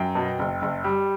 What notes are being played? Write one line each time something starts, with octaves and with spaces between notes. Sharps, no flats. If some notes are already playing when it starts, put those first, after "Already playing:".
Already playing: F#2 G5
B2
F#1
F#1
G3